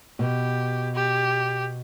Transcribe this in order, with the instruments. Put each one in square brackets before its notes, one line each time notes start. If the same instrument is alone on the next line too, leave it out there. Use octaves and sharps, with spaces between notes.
[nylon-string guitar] B2 [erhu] G4
[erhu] G4